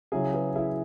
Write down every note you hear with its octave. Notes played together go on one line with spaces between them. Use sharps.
C#3 F#3 E4 G#4
G#4 B4
E4 G#4